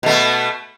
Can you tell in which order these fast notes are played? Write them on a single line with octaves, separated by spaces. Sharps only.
B2 A3 B3